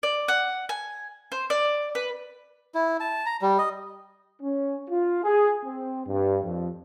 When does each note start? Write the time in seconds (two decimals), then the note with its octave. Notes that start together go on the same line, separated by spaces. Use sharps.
0.03 D5
0.28 F#5
0.69 G#5
1.32 C5
1.50 D5
1.95 B4
2.74 E4
3.00 A5
3.26 A#5
3.41 G3
3.58 D#5
4.41 C#4
4.90 F4
5.24 G#4
5.65 C4
6.07 G2
6.44 F2